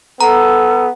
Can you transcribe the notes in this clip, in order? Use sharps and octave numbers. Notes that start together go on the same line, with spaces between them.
B3 A4 A#5